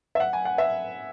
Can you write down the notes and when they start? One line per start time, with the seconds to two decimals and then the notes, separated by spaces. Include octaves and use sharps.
0.15 E5
0.20 F#5
0.33 G#5
0.45 F#5
0.58 E5